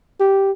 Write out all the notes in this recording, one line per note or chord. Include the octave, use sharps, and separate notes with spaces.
G4